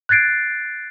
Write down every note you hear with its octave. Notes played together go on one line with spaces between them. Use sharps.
F#6 G#6 A6 C7 D7